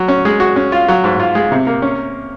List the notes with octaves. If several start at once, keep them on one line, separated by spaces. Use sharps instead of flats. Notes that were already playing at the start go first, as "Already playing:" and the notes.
Already playing: F#3
C#4
G#3
F#4
C#4
F4
F#3
G#2
F4
G#3
C3
A#3
C#4